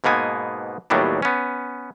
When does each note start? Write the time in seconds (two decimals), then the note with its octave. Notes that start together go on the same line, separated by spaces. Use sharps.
0.04 G#2 B2 A#3 B3 G#5
0.90 D#2 A2 F#3 G3 B3 D4
1.22 B3 C#4